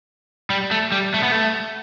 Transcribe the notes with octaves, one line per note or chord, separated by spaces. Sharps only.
G3
A3
G3
A3
B3
A3